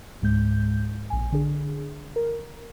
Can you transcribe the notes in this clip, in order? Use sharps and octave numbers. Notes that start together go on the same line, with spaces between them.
C#2 G#2 G#3 G6
A#1 G#5
D3 D4 G#4
A#4